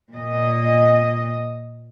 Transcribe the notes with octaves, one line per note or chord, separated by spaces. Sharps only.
A#2 D#5